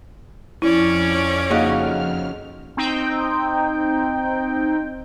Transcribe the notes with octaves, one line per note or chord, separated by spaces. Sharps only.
F2 C#4 E4 C#5 D5 F6
C#3 A#3 D#4 F#4
C4 D#4 G5